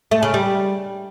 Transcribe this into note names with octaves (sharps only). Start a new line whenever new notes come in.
A3
C#3
G3